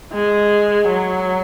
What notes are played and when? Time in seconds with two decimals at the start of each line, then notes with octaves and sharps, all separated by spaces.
0.13 G#3
0.88 F#3